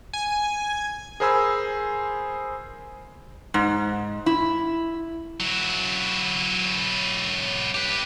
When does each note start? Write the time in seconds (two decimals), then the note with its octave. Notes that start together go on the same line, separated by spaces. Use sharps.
0.13 G#5
1.20 G#4 A#4 C5 G#5 B5 E6
3.54 G#2
4.26 E4
5.40 F#3 E4
7.75 G4 B4